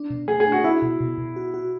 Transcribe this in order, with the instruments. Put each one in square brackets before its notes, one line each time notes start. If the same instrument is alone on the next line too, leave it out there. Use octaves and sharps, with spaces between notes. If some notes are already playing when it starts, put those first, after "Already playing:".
Already playing: [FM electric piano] D4
B2
[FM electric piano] A3 [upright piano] G#4
[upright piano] G#4
[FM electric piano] D4
[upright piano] F#4
[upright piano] E4 [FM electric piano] F#4
[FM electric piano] B2
B2
B2
F#4
F#4